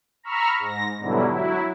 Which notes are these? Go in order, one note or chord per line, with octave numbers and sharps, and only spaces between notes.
A#5 B5 C#6 E6 F6
G#2 A#6
G#2 B2 D3 F#3 G3 E4
F#3 E4